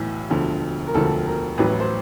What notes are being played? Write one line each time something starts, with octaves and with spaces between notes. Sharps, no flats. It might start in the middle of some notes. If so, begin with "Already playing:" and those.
Already playing: B1 A2 E3
E1 D2 D3 F3
A#4
E1 D2 D3 F3 A4
A#4
A1 A2 F#3 B4
C5